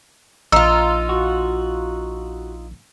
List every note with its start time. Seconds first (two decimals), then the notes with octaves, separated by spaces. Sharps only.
0.52 A#1 D#4 F4 E6
1.09 F#4